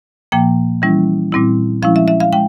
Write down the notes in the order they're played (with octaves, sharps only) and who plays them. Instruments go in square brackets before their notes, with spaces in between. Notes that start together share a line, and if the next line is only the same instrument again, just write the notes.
[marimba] A#2 F3 A#3 G5
E3 G3 C#4 E4
A#2 G3 C4 E4
F3 G#3 C#4 E4 F5
E5
E5
F5
G#3 G5